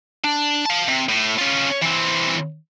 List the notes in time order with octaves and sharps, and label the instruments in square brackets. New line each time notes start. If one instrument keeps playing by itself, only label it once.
[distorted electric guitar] D4
F5 A5
C3
A2
C#4 F4
E3 C4